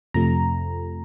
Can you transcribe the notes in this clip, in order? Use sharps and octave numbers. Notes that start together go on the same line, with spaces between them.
F2 C3 F3 A3 A#5